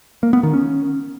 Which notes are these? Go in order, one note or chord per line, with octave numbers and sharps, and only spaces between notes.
A#3
B3
D#3
C#4